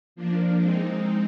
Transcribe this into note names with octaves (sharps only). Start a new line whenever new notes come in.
F3 A#3 D4
G#3 C4 D#4